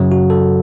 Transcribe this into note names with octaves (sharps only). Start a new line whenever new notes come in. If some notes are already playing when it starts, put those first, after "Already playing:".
Already playing: F#2 C#3 F#3
F#4
A4